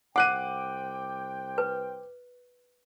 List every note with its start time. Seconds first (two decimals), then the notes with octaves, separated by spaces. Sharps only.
0.16 C2 C5 F#5 G5 D6 F#6 D#7
1.58 B4